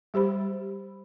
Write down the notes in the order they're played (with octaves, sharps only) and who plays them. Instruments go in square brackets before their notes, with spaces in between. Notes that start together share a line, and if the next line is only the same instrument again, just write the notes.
[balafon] G3 G4 C5 B5